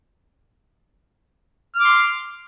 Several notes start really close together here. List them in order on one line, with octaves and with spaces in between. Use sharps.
F6 D6 C6